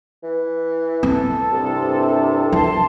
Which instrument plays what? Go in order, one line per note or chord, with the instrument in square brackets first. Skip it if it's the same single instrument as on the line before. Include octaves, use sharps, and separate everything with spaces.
[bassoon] E3
[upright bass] C4 [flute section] A4
[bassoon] C2 [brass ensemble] G2 C3
[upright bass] E3 [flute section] A5 C6